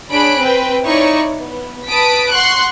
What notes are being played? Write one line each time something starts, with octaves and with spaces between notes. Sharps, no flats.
D4 G#4 C#5 B5 F#6 D7
C4 B4 G5
D#4 E4 C#5 D5 C#6
B3
B4 A5 D#6 B6 D7
F#5 C6 C#6 F#6